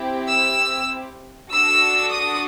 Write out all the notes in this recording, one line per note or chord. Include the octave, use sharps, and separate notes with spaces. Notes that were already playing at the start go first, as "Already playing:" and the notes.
Already playing: C4 E4 G4
E6
D4 F#4 A4 E6
D#6